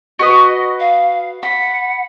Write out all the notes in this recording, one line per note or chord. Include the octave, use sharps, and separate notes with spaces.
F#4 B4 D#5 D#6
F5
F#5 B5